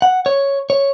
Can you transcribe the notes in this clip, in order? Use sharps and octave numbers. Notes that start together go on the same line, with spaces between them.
F#5
C#5
C#5